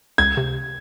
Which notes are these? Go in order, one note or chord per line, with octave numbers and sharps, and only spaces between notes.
C#2 G#6
C3